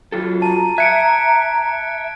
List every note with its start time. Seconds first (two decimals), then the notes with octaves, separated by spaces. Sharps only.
0.12 F#3 F4 A4
0.42 A5 A#5
0.78 E5 F#6 G#6 C#7 D7